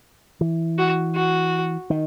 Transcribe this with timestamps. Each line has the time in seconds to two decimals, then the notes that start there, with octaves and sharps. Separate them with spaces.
0.41 E3
0.78 F#4
1.16 F#4
1.90 D#3